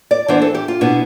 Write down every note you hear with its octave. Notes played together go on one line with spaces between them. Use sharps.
D5
E3 B3 D4 C5
A4
G4
F4
B2 B3 D4 E4